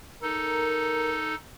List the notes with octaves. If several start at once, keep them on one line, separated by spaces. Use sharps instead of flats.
D#4 A4 A#4